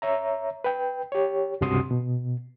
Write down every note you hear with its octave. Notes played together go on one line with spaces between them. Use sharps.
C#5 E5 A#5
B4 G5
G4 C#5
C#2 G2 C3 F#4 C6 D#6
B2